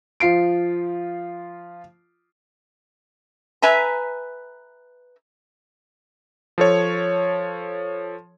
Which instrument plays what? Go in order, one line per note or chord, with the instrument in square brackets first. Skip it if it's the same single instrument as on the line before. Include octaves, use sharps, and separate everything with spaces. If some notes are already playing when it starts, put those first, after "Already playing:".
[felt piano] F3 F4 C7 D7
[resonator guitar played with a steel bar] B4 E5 G#5 A#5
[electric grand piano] F3 A4 C#5